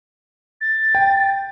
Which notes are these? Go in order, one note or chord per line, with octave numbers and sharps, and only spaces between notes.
A6
G5